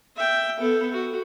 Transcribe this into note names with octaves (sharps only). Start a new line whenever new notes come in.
E5 G5
B3 A4
F#4